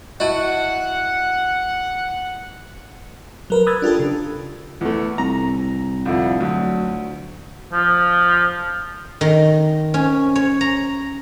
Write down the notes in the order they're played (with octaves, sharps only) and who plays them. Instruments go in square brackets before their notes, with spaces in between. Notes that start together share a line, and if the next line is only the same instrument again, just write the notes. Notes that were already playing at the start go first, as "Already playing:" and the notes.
[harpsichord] E4 F#4 [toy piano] D#5 A5 [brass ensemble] F#5
[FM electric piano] F#3 A#4 B4
B5 D#6 E6 F#6 G#6 A6
D4 F4 G4 A4
C#3
[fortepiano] E2 A3
[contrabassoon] C2 [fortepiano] A#5
[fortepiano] F2 D3 E4
[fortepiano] D2 [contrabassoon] F#3
[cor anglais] F3
[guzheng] D#3
C#4
C#5
A#5